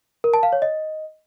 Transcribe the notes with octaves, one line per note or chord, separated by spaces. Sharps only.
A#4
A5
F5
C#5
D#5